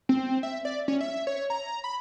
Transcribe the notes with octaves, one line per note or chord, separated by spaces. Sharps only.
C4
E5
D5
C#4
E5
C#5
A#5
B5